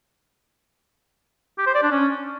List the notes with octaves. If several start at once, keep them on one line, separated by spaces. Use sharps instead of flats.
G4
C5
D5
D4
C#4